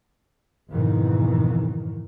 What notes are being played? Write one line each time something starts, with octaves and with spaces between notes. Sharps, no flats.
G#1 F2 G#2 B2 D#3 E3